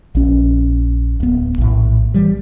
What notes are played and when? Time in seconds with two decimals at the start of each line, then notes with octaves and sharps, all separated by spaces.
0.15 A#1 C#4
1.20 D1 B3
1.58 A#1 A2
2.14 E3 G3